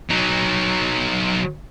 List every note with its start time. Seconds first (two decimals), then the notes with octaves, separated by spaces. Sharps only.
0.10 F#3 D#4